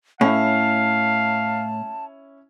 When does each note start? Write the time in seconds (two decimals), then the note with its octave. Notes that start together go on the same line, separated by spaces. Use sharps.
0.21 A2 C#4 E4 F5 A5